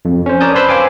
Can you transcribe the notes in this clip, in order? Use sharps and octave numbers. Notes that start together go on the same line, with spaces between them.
F2
C#4 C5
A#4 C#5 D5 A5 D#6 G6
B4 C5 A5 B5 C6 E6
C5 F5 G5 G#5 D6